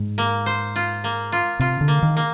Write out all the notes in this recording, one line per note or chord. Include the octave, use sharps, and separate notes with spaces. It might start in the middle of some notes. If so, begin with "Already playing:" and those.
Already playing: G#2
A#3
C5
F4
A#3
F4
C3 F4
D3
A#3
D#3
A#3